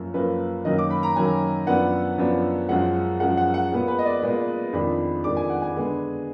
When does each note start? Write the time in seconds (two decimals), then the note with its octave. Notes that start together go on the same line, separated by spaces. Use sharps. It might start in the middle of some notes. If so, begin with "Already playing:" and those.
Already playing: F#2 F3 A#3 A#4
0.14 F#2 F3 A#3 B4
0.65 F#2 D#3 F#3 A#3 D#5
0.78 D6
0.90 B5
1.03 A#5
1.16 F#2 D#3 F#3 A#3 G#5
1.67 F#2 F3 B3 D4 F#5
2.18 F#2 F3 B3 D4
2.69 F#2 F3 G#3 F#5
3.20 F#2 F3 G#3 F#5
3.37 F#5
3.54 F#5
3.72 A#2 G#3 B3
3.88 B4
3.99 D#5
4.05 D5
4.22 A#2 G#3 B3 D5
4.73 F2 D#3 G#3 D4 B5
5.24 F2 D#3 G#3 D4 D6
5.37 G#5
5.50 F#5
5.62 G#5
5.75 D3 G#3 B3 D4